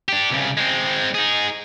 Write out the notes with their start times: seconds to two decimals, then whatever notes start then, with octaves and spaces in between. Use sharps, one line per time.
0.09 D4 G4
0.31 C2 C#3
0.57 G#3 C4
1.15 D#4 G#4